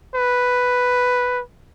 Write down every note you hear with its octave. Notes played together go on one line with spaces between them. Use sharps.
B4